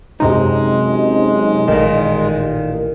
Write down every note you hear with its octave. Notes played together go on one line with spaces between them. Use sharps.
F#2 C3 G#3 D#4
A1 A#2 D#3